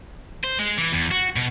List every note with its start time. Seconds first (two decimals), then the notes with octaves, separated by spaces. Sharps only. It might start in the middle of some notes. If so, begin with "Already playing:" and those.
0.44 C5
0.59 G#3
0.78 E3
0.92 E2
1.11 F#4
1.36 B2